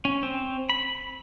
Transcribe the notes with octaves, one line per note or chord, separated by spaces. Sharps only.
C#4
C4
B5